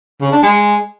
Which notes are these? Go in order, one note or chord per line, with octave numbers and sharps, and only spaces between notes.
C#3
D4
G#3